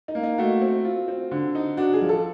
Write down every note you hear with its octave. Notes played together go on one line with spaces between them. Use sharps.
D#4
A#3
D#4
A3 F#4
C4
F4
C4
D3
D#4
D4 F#4
G#4
F3
A4